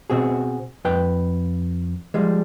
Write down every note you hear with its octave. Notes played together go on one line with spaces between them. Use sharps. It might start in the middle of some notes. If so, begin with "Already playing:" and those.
B2 C4 F#4 G#4
F2 B4 G5
F3 G3 G#3